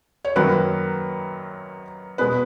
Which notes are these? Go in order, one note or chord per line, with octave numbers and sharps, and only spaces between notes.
C#5
F#2 D#3 F#3 A#3 B4
B2 G#3 B3 B4